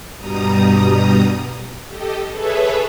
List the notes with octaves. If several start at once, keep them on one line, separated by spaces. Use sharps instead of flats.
G2 B2 G3 A#5 D#6
G4 A4 D#5
G#4 A4 B4 C#5 E5